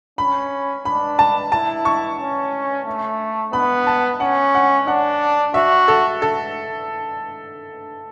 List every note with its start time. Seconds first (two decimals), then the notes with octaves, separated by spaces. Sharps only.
0.18 C#4 B5
0.85 D4 B5
1.19 A5
1.52 E4 A5
1.85 C#6
2.20 C#4
2.86 A3
3.53 B3 B5
3.87 A5
4.20 C#4 F#5
4.55 F#5
4.87 D4 F#5
5.54 F#4 E5
5.88 A4
6.22 A4